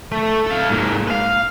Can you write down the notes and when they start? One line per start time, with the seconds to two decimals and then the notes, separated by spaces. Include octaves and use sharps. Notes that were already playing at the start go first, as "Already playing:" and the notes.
0.12 A3
0.47 A4 F5
0.69 G#2 A#3
1.07 B4 F5